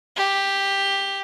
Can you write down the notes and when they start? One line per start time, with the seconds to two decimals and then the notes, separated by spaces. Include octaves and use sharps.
0.17 G4